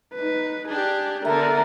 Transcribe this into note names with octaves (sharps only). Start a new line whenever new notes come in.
D#4 B4
D4 G4 G#4
D3 B3 D4 A#4 E5 A#5